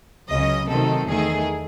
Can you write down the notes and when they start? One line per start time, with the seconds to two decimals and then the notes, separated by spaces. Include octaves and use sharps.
0.28 C#2 C#3 F#3 C#4 D#5
0.68 C3 D#3 F#3 A3 C4 A4
1.07 E2 D#3 A3 G#4